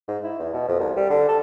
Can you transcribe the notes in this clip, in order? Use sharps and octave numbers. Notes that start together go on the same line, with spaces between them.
G#2
E4
E2
B2
F2
C2
G3
D3
A4